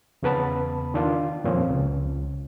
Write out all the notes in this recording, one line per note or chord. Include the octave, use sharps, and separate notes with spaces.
E2 C#3 B3 B4 A5 B5
D#3 D4 F4
F2 A#2 F3 C4 C#4
C#2